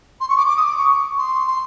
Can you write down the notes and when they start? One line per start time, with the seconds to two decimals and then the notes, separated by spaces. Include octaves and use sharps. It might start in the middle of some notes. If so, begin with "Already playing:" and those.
0.20 C6
0.28 C#6
0.36 D6
0.46 D6
0.56 D#6
0.67 D6
0.77 C#6
1.18 C6
1.46 C6